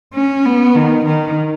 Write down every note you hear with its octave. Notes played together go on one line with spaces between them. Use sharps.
C#4
B3
D#3
D#3